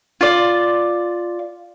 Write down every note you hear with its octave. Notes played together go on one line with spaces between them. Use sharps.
F4 D5